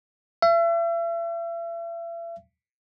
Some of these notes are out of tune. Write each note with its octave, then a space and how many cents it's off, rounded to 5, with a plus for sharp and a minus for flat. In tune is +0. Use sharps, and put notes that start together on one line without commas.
E5 +40